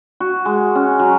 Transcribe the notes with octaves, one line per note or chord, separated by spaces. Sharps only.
F#4
G#3
C#4
F#3